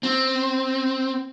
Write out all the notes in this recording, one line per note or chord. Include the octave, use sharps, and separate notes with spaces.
C4